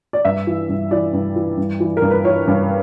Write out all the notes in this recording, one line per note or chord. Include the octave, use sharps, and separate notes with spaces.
D5
G2 E5
E3
G2
E3 D5
G2
E3
G2
E3
A#4
G2
B4
E3 C#5
G2